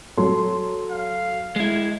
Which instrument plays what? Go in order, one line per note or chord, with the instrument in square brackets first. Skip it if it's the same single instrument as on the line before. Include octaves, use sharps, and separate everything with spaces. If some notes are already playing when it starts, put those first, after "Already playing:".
[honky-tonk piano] F#3 C6 [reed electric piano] A4
[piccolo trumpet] F5
[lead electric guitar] G#3 E4 [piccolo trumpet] G#6